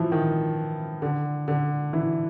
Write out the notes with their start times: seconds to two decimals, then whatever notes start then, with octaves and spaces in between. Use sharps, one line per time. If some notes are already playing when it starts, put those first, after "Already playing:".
Already playing: E3 F3
0.12 D#3
1.02 D3
1.48 D3
1.93 E3